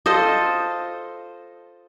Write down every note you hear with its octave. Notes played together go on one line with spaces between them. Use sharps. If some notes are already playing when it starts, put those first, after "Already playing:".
F4 A4 C5 D#5